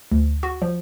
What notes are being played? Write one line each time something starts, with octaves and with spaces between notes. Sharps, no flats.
D2
F#4
F3